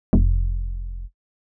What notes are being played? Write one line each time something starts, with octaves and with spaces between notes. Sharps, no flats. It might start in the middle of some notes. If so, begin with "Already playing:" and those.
F1